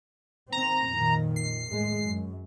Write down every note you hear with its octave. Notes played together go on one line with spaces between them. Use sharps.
D#3 C4 A#5
F2 A#2 D#3
C7
A2 G#3
F#2